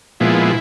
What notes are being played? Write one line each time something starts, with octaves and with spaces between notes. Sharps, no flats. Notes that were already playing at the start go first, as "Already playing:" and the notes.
A#2 F3 G#3 B3 E4